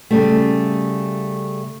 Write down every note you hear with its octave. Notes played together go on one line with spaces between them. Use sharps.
C#3 G3 A3